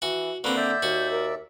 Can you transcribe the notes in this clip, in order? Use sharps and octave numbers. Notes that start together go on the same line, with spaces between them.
E3 F#4
D3 A#3 C4 B4 C#6
D5 E5 E6 G6
D#2 F#4
A#4